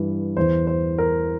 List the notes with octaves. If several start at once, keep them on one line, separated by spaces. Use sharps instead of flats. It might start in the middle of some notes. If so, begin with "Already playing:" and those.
Already playing: G2 E3
E2 E3 C5
C5
A#4